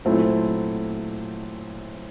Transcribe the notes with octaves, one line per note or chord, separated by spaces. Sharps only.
A#2 F#3 A3 C4 E4